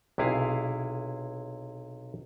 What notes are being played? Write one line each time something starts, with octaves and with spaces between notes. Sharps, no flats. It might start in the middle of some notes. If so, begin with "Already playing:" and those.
B1 C3 E4 G#4 F5